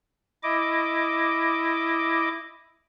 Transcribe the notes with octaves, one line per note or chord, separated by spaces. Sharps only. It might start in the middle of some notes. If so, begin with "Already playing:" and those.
E4 D#5 D6